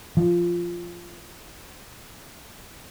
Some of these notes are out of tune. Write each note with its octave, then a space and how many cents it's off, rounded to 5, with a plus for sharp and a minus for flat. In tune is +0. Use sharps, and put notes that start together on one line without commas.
F3 -10